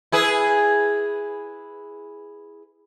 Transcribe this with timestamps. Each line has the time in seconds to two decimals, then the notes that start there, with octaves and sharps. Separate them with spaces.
0.12 E4 G#4 B4